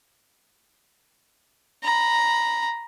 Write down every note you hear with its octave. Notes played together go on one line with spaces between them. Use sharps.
A#5 B5